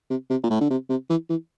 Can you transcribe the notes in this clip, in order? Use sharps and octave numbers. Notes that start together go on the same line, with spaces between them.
C3
C3
A#2
A2
D3
C3
C3
E3
E3